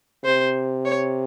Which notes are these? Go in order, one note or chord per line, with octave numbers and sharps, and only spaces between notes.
C3 C5
C#5